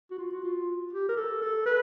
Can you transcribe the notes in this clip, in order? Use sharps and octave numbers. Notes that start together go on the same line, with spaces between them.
F#4
F4
F#4
F4
G4
A#4
A4
A4
B4